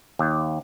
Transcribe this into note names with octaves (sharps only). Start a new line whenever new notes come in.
D#2